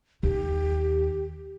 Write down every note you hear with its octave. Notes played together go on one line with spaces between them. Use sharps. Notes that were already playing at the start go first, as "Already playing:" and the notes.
D#2 G4